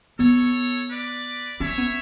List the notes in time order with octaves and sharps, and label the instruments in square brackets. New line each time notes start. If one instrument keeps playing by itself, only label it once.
[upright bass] B3 [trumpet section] A4 C#5
[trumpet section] B4 D5
[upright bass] C#4 [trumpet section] C#5 E5
[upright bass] B3